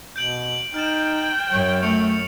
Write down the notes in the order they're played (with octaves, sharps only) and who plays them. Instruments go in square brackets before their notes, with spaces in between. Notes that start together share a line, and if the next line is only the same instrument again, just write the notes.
[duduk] B2 [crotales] G6 D7 F#7
[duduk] D#4 [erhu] G5 [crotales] F6 A6 E7
[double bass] F#2 [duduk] C#5
[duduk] A3 [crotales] C#6 C#7 F7